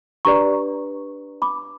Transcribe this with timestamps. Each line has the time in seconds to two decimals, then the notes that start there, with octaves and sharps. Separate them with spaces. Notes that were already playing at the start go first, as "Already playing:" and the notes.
0.25 D4 G4 B4 D5 A#5 C#6
1.42 B5 D6